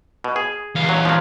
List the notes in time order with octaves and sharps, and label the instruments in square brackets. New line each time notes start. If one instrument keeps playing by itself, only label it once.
[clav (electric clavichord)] B2
G#4
[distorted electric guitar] E2 F5
[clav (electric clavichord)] F#3
F3 F#3